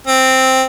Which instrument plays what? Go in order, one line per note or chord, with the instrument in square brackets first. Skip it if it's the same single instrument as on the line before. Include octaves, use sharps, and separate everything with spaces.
[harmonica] C4